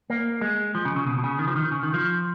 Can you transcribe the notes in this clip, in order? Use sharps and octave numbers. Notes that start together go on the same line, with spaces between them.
A#3
G#3
F3
C#3
C#3
B2
B2
C#3
D#3
F3
D#3
C#3
D#3
F3